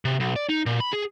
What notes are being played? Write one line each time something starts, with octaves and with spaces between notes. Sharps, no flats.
C3
B1
D5
D#4
A#2
B5
G#4